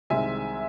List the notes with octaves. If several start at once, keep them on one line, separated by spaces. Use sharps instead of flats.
C2 C3 D#3 G#3 C4 E5 G#5